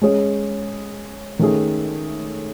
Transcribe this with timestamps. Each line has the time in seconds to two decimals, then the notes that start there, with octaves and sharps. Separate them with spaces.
0.02 G#3 C#4 G#4 C#5
1.39 D#3 A3 C#4 G#4